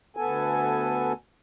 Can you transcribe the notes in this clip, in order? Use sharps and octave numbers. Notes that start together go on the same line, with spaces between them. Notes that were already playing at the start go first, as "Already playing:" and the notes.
D2 B3 A4 G#5